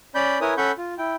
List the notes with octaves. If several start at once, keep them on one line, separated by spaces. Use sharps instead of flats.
C#4 D5 B5 G6
E4 A#4 B4 C#5 G#5 D#6
C#4 A4 F#5 B5 C#6 G6
F4
E4 G5